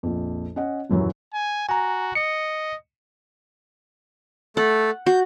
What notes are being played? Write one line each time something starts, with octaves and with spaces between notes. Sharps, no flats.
A#1 F2
C#4 D#5 F#5
D#1 F#2 E3 F#3
G#5
F#4 G#5 A#5
D#5 C#7
A3 A4 F#5
F#4 G6